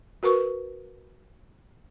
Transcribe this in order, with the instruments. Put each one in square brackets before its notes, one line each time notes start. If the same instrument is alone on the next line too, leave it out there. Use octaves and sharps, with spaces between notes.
[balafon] F#4 A#4 B4 C#6